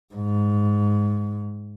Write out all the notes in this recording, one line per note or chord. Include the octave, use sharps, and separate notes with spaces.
G#2